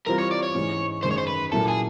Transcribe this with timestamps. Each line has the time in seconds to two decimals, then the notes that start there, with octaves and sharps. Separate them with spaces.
0.07 E3 G3 C4 F4 A#4
0.18 C#5
0.31 D5
0.43 C#5
0.55 G#2 E3 G#3 C#4
1.03 F#2 D#3 G#3 C5
1.11 C#5
1.18 C5
1.27 B4
1.52 A#2 F#3 A#3 C#4 E4 A4
1.68 G#4